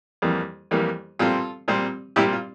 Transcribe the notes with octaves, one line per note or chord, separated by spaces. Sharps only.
F2 E3 G3 A#3
F2 E3 G3 A#3
A#2 G3 C4 F4 A4
A#2 G3 C4
A#2 G3 C4 E4 G4
F4